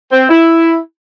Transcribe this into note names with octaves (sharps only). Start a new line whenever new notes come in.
C4
E4